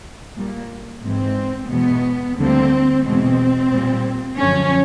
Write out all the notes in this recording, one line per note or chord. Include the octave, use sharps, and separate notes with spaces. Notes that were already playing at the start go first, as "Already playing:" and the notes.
A#2 G3 A#3
G#2 E3 G#3 C4
E2 B2 G#3 B3
D2 D3 G3 A#3 C4
E2 B2 G#3 C4
A#2 G3 A#3
F#2 D3 F3 C#4